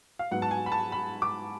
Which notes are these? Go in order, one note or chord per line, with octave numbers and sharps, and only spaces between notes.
F5
G#2 F#3 B3 F#5
A5
G#5
B5
A5
B5
D6